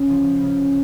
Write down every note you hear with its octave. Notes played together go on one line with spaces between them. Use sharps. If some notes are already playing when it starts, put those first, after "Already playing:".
Already playing: C#3
F3
C#3